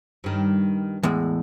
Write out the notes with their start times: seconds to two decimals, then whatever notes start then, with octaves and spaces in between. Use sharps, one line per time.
0.24 G2 D#3
1.03 E2 A2 G#3